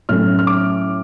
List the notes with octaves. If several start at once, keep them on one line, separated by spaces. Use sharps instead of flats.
A2 F#3 A3 C#4 F6
F6
D6